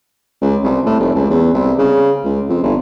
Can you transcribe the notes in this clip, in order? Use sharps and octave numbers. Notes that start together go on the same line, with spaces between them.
C#2
C2
A2
F1
C#2
E2
C2
C#3
C#2
F2
G1